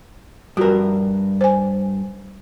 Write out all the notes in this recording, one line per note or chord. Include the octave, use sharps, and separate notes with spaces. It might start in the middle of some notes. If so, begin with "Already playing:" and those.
G2 F4 F#4 A#4
C5 G#5